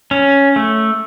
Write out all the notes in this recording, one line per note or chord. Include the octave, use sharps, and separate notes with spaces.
C#4
A3